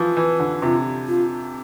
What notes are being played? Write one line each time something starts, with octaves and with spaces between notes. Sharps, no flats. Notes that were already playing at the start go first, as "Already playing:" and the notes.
Already playing: E3 F3
E3
D3
C3 F4
F4